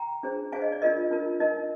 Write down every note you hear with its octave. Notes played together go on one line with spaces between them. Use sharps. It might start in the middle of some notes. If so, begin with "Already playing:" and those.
Already playing: G5 A#5
D4 G#4 C5
D4 G#4 C5 F5 G#5
D#5
D5
D4 F4 A#4 D#5
D4 F4 A#4
D#4 A#4 D#5